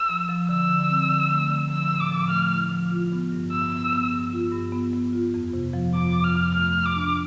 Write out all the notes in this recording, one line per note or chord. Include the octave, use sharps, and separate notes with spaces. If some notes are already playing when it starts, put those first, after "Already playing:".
Already playing: E6
F3
F3
D3 E6
D3
C4
D3
A3
D3
F3 E6
A2
D6
F3
A3 F6
E4
F3
F4
B3
G2
B3 E6
B3
B3
G2
F4
G2
B3
B3
F4
F2
C3
F3
F2 D6
F3
F6
F2
A3 F6
A3
D6
D4